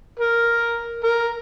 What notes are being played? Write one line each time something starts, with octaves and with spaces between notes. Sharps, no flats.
A#4
A#4